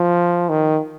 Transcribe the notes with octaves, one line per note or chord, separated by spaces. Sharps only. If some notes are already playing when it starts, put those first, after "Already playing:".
Already playing: F3
D#3